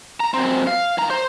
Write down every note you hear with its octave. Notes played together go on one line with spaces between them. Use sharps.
A#5
F#2 C4
F5
D#3 A#5
C5